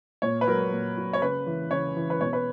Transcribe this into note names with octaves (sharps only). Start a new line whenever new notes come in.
A#2 C#5
B4
F#3 A#4
A#2
F#3
C#5
C#3 B4
E3
C#3 C#5
E3
B4
B2 C#5
B4